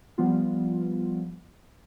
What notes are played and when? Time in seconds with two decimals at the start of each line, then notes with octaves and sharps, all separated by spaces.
0.18 F3 G3 B3 F4